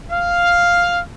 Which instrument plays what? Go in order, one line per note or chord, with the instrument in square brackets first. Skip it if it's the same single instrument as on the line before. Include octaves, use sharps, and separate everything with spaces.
[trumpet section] F5